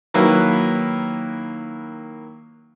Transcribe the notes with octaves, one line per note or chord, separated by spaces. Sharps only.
D#3 F#3 A#3 E4 B4